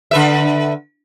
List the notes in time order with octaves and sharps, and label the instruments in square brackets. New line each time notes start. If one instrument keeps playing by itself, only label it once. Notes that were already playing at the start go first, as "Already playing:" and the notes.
[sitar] D3 B4 E5